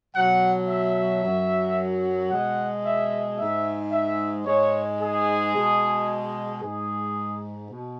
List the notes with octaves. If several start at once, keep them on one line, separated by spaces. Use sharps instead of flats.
B2 F#3 F#5
E5
F#2 F#3
B2 G#3 F#5
E5
G#2 G#3 E5
E5
G#2 G#3 C#5
G#4
B2 G#3
G#2 G#3 G#4
B2